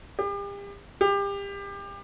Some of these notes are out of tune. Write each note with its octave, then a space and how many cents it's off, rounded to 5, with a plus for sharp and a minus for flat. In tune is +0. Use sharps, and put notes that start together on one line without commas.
G4 +40
G4 +30